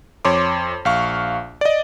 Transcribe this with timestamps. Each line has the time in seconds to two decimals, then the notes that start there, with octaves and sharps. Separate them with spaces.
0.25 F2 C#5 C6 D6
0.85 A#1 F5 C#6
1.61 D5 D#5